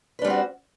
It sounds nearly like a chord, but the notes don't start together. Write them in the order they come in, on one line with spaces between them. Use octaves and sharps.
B4 D4 G3 C4 F#4